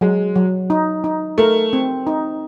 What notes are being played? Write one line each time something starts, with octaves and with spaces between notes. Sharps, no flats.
F#3 G#3
F#3
D#4
D#4
A3 A#4
C4
D#4